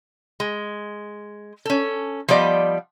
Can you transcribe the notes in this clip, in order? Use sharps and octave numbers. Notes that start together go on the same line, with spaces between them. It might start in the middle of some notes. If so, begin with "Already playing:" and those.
G#3
C#4 A4
F3 G3 B3 D5 D#5